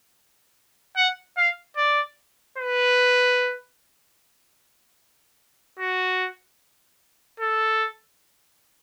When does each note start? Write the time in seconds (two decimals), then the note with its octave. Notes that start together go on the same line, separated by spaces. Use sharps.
0.96 F#5
1.37 F5
1.76 D5
2.58 B4
5.79 F#4
7.40 A4